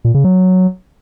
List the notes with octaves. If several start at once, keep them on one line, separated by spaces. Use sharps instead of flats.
A#2
C#3
F#3